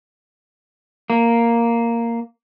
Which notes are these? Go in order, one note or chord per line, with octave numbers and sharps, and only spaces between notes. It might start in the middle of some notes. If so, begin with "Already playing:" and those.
A#3